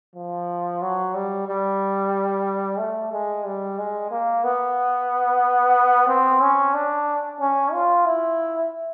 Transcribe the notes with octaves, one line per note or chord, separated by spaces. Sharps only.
F3
F#3
G3
G3
A3
G#3
G3
G#3
A#3
B3
C4
C#4
D4
C#4
F4
E4